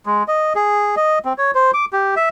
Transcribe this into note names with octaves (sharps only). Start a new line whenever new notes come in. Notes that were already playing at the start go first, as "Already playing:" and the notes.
G#3
D#5
G#4
D#5
C4
C#5
C5
D6
G4
E5